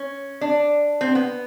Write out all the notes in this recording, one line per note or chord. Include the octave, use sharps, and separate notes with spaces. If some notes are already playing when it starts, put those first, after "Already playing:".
Already playing: C#4
D4
C4
B3